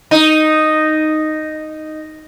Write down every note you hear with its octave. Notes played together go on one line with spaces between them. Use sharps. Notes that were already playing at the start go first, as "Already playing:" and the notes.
D#4